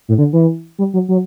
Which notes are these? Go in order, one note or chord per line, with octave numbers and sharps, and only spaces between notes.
A2
D3
E3
G3
F#3
F#3